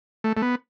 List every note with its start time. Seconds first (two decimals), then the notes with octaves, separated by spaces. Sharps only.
0.24 A3
0.37 A3
0.42 B3